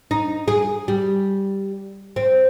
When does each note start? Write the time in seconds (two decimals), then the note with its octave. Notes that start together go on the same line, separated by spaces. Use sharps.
0.11 D#4
0.48 G#4
0.88 G3
2.16 C4